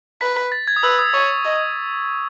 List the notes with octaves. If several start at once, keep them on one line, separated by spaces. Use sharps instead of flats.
B4 B6
B6
A6
G#6
D#6
B4 E6
D#6
C#5 C#6
D#5